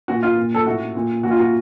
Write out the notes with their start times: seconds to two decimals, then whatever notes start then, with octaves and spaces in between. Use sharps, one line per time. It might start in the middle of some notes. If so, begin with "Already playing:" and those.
0.08 A#2 F#4
0.23 F4
0.36 A#2
0.54 A4
0.66 A2 F#4
0.95 A#2
1.23 A#2 F#4
1.31 F4
1.39 F#4